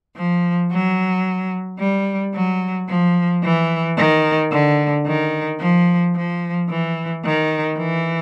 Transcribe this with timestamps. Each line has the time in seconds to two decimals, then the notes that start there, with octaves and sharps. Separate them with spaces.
0.16 F3
0.71 F#3
1.79 G3
2.34 F#3
2.89 F3
3.43 E3
3.97 D#3
4.52 D3
5.07 D#3
5.60 F3
6.15 F3
6.70 E3
7.24 D#3
7.78 E3